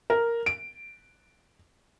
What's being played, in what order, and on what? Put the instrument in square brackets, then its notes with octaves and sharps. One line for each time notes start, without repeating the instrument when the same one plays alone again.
[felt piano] A#4
D7